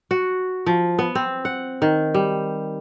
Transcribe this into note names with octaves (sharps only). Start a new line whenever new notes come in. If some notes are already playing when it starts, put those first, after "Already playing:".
F#4
F3
B3
C4
F#5
D#3
G3